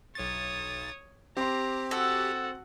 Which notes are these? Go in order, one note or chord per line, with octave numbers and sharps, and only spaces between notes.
B1 C#5 D#6 A6
C4 G4 A#5 C6
F#4 A4 F#5